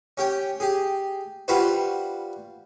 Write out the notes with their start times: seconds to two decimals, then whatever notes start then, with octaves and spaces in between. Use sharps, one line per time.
0.17 C#4 G4 G5
0.60 G4 G#4
1.48 G3 F4 F#4 B4 C5